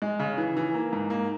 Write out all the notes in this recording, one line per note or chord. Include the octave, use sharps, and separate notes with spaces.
G#3
C#3
E3
E3
A#3
G#2
A#3